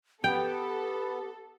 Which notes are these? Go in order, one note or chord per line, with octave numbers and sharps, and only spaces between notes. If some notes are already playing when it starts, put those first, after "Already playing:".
B3 G4 A4 G5